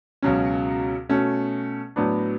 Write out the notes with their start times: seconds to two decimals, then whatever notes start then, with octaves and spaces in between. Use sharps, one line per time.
0.22 C#2 B2 F#3 C#4
1.09 B2 A3 C#4
1.96 A2 F#3 B3 D4